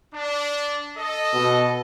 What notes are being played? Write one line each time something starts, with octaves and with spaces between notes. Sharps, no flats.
D4
A4 D#5
B2